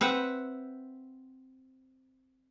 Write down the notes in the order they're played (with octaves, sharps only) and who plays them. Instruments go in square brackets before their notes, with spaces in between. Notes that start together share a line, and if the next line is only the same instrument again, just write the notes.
[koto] C4 B4 E5 F#5